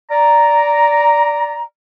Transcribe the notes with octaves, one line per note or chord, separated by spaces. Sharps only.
D5 A#5